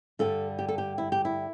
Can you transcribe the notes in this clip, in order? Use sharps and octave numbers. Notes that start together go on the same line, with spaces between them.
G2 D3 G3 A4
G4
A4
G4
E4
G4
E4